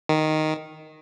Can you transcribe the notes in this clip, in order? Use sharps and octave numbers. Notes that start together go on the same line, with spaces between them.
D#3